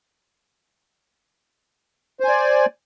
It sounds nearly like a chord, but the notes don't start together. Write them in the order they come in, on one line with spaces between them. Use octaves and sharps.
C5 G#5 D5